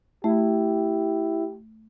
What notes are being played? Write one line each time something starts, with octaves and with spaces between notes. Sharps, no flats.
A3 E4 G4